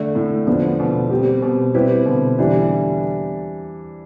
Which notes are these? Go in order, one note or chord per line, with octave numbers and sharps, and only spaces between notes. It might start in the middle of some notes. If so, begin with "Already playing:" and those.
Already playing: D3 A3 D4
A2
D3 F3 B3 D4
B2
G3 C4 G4
B2
G3 C4 E4 G4 B4
B2 D3
E3 G3 D4